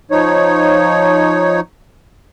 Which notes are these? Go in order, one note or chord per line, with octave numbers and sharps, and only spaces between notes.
F3 D#4 C#5